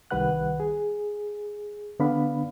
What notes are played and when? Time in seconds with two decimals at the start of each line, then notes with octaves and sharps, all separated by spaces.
0.11 C2 D#3 G3 B4 F#5 F#6
0.60 G#4
2.00 D3 B3 D4 F5 B5